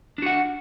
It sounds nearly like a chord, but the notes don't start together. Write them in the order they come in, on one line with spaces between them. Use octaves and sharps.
D4 F#4 F#5